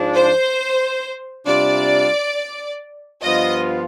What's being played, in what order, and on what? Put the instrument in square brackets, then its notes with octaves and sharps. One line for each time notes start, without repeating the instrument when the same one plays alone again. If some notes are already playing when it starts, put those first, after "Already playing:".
Already playing: [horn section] G#2 F3 G#3 D4 F4
[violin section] C5
[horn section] C3 G3 D4 F4 [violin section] D5
[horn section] G2 F3 B3 F4 [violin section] D#5